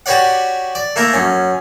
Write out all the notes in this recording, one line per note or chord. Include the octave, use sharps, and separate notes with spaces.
F#4 G4 B4 C#5 D5 F#5
D5
A3 A#3 E4 A#4
F#2 C#4